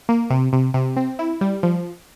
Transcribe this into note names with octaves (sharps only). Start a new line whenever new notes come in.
A#3
C3
C3
C3
C4
E4
G3
F3